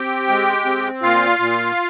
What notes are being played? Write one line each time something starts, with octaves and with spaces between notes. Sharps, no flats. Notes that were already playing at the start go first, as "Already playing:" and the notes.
Already playing: C4 G4 G5
G#3
C4
A#2 F4 F5
A#2